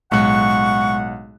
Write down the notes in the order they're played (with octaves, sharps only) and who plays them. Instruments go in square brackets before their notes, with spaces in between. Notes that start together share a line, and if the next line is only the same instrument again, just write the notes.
[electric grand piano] B1 F#6 [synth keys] A2 G#3 [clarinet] F#5 [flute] C#6